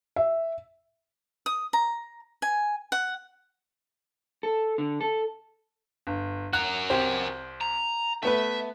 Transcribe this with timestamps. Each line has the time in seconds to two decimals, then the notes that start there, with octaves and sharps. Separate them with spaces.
0.16 E5
1.46 D#6
1.73 A#5
2.42 G#5
2.92 F#5
4.43 A4
4.78 D3
5.01 A4
6.07 G1
6.53 F#4 A#4 F#6
6.90 C2 G4 C5
7.61 A#5
8.23 A3 B3 B4 E5